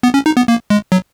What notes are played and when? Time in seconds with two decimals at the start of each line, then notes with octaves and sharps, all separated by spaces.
0.03 B3
0.14 C#4
0.26 D#4
0.37 B3
0.48 A#3
0.70 G#3
0.92 F#3